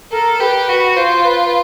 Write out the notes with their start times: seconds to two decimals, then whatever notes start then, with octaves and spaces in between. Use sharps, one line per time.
0.12 A4 A#4
0.40 G4 B4
0.69 F#4
0.96 F4 C5
1.25 B4